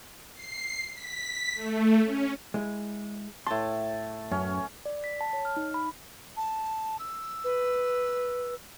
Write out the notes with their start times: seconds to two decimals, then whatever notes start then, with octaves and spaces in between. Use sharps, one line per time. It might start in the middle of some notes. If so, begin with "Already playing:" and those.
0.35 C7
0.92 B6
1.54 A3
2.03 C#4
2.54 G#3 E4
3.47 A2 A5 C6
4.31 F#2 C#4
4.86 D5
5.04 B6
5.21 A5
5.33 C#5
5.45 F6
5.56 D#4
5.74 B5
6.37 A5
6.99 E6
7.44 B4